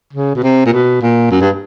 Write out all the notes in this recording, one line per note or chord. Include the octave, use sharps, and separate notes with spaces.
C#3
B2
C3
A#2
B2
A#2
F#2
G2